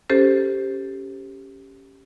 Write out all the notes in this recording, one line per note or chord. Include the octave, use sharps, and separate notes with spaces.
C#4 G4 A4 C5